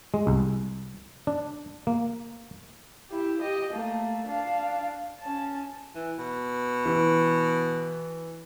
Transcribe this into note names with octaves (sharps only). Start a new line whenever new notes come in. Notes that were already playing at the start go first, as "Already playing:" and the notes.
G#3
C2
D4
A#3
E4 G4
G4 D#5
A3 A#3
D4 F5
C#4 A5
E3
B2
E3